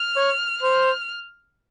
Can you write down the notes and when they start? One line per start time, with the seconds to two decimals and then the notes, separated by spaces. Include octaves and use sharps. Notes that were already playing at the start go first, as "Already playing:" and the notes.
Already playing: F6
0.16 C#5
0.63 C5 F6